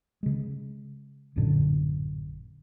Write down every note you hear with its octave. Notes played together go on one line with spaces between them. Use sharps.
C#3 G#3
A1 F#2 A#2 D3